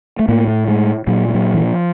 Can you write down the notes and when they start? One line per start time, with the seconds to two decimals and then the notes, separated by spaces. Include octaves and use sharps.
0.19 A3
0.28 A2 A#3
0.48 A3
0.68 G#3
1.07 A#2 F#3
1.29 G3
1.34 F#3
1.54 E3
1.61 F3